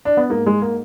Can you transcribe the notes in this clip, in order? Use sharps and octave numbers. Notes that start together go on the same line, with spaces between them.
D4
B3
G#2 A#3
G#3
A#3